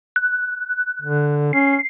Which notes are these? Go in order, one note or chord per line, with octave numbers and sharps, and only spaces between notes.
F#6
D3
C#4 C7